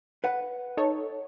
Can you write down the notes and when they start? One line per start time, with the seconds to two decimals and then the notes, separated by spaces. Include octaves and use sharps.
0.24 B4 F#5
0.77 D#4 A4 C#5